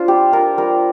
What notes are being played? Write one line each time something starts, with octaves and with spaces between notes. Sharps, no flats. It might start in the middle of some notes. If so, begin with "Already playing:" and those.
Already playing: D4 F4 C5
G3 G4
D4 F4 A#4
G3 A#4